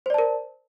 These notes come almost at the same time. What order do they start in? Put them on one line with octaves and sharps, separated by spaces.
C5 D5 A5 A#4